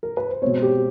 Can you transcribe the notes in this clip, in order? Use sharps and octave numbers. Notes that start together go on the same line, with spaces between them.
A#4
B4
C5
B2 G#3 C4 C#5
G4